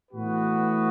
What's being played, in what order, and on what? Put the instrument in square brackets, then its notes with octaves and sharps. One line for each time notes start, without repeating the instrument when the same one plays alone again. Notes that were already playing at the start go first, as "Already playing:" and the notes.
[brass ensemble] A2 E3 B3 F#4 B4